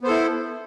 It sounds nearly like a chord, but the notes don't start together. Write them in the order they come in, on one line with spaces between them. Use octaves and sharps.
B3 C5 A4 E4